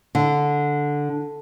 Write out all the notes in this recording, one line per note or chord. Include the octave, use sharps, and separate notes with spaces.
D3